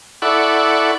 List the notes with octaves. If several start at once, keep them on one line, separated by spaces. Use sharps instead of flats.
E4 A4 D5 F#5 B5 C#6